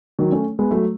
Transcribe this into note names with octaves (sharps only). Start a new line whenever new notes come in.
D#3 F#3
A3 C#4
G#3 B3
F#3 A3